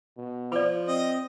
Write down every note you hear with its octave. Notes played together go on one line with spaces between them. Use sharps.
B2
F3 D5 B5
C4 D#5